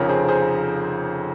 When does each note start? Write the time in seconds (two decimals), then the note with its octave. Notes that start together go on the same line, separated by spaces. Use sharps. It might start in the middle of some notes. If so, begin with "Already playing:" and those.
Already playing: F1 F2 C#3 F3 A#4 C#5
0.09 G#4 C5
0.28 G#4 C5